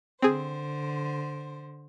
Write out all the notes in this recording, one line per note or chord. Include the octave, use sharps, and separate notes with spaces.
D3 C4 G#4 C5